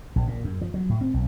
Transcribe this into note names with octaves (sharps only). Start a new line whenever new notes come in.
A#1
A#2
F#2
F3
F#3
A2
C4
B1